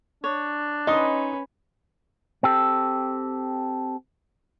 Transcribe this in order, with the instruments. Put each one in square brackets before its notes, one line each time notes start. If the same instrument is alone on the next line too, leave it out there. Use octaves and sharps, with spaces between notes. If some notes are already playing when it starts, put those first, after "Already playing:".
[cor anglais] D4 [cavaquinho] C#5
[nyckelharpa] C#4 B4 [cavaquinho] D#4 C6 D#6 [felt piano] D#5
[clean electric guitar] C4 G4 A4